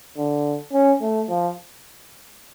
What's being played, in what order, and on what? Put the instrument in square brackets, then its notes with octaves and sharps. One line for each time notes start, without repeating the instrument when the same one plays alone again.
[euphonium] D3
C#4
A3
F3